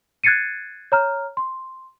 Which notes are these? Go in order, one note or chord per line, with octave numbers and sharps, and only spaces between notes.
F#6 G#6 A6 C7 C#7 D#7
C#5 A#5 F6
C6